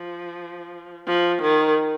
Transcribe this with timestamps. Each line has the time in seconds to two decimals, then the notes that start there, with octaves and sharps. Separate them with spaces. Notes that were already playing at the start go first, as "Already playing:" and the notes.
Already playing: F3
1.07 F3
1.42 D#3